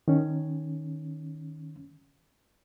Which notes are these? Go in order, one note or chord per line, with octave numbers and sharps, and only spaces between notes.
D#3 C#4